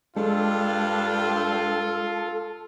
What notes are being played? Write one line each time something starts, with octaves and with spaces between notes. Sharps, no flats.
G2 G#3 D4 F4 A4